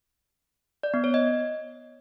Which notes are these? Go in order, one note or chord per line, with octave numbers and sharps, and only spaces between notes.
D5
B3
C#5
D#5